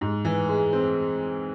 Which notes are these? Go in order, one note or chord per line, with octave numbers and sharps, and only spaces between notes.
G#2
E3
G#3
C4